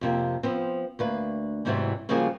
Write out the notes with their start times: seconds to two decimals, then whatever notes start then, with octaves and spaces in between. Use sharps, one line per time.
0.01 F2 C3 A#3
0.43 F3 B3 C4
0.99 D2 A#3 B4
1.65 E2 G#2 C3 E3 F#3 B3
2.09 C#3 F3 G3 A#3 F#4 G#4